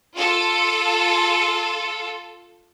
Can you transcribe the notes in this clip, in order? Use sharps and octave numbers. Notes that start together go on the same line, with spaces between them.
F4 A4